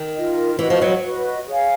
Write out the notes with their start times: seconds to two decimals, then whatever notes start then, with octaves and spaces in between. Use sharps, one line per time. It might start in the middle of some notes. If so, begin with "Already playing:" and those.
Already playing: D#3
0.15 F4 A#4 D#5
0.59 E3 F#4 B4 D#5
0.70 F3
0.82 F#3
1.03 F#4 B4 D#5
1.47 G#4 C#5 F5 G#5